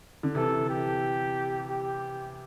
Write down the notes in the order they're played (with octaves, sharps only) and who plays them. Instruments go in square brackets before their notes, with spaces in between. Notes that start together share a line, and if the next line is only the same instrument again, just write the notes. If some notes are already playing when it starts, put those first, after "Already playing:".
[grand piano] D3
[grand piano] C3 E3 [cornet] A4
[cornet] G4
G4